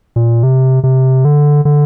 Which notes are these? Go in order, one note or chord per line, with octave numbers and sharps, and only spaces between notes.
A#2
C3
C3
D3
D3